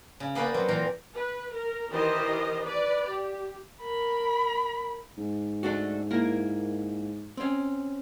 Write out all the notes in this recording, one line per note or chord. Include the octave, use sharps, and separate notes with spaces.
C#3
A#3 B3 C#4 B4 D5 G5
F#3 C4
A#2 E3 A#4 G5
B4
A#4
D#3 E3 G4 A#4 C5 D#5
B4 D5
G4
A#4 B5
G#2
A3 D4 F#4
A#3 E4 A#4
C4 C#4